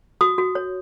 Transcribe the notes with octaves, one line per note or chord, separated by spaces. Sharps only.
F#4 D#6
F#4
C#5